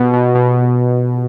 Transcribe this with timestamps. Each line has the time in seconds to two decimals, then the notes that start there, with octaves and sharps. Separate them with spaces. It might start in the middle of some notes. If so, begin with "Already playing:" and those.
Already playing: B2
0.13 B2
0.35 B2